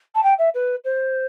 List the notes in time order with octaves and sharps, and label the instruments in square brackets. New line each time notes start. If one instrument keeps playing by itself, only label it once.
[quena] A5
G5
E5
B4
C5